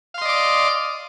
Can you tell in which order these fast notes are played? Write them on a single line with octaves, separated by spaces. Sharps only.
F5 C6 D#5 D5 D6